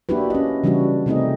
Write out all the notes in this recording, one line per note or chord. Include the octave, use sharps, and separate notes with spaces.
A#3 D4 E4 F#4 G4 B4
C#4 D#5
C#3 E3 G3 D4 E4 F#4
C3 A3 C4 D#4 G#4 D#5